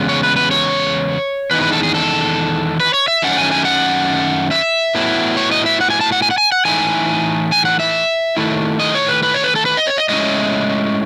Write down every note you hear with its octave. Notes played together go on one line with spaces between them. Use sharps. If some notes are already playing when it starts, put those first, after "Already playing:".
Already playing: E2 C#3 G#3 B3
C#5
B4
B4
C#5
E2 D#3 G#3 D#4 B4
B4
A4
G#4
A4
B4
C#5
E5
F#2 D#3 F#3 A3 C#4 F#5
G#5
G#5
F#5
E5
A2 F#3 B3 E4
C#5
D#5
E5
F#5
G#5
A5
F#5
G#5
F#5
G#5
F#5
A2 E3 A3 D#4 G#5
G#5
F#5
E5
D#3 A3 E4
D#5
C#5
B4
B4
C#5
B4
A4
B4
D#5
C#5
D#5
A2 G#3 C#4 E4 D#5